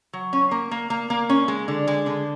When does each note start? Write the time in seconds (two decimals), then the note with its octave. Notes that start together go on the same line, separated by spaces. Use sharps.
0.13 F#3
0.33 C#4
0.51 A#3
0.71 A#3
0.90 A#3
1.10 A#3
1.29 C#4
1.48 G#3
1.68 D3
1.87 G#3
2.06 D3